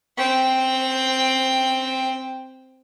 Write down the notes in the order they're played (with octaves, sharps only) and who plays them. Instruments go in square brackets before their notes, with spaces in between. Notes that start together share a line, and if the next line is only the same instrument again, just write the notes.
[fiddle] C4 G5